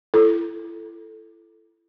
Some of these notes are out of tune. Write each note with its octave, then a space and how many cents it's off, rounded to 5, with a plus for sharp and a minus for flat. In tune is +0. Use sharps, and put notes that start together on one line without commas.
E4 +35 A4 +0